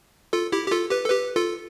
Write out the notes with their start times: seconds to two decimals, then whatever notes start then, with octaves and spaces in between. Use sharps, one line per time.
0.33 F4 A4
0.52 E4 G4
0.68 G4
0.71 F4 A4
0.90 G4 B4
1.05 A4
1.10 G4 B4
1.36 F4 A4